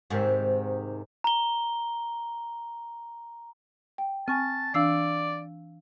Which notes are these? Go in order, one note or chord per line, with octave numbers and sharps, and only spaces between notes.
G#2 C3 D#3
A#5 G7
G5
C4 G#5 A5 C#6 F6
E3 D4 D5 F5 E6 C7